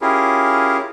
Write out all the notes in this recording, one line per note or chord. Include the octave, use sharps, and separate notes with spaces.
C#4 E4 F4 G4 G#4 A#4